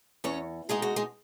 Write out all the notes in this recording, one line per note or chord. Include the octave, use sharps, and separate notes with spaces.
E2 C#4 C#5
B2 G#3 D#4 G#4
F#4
G#3 G#4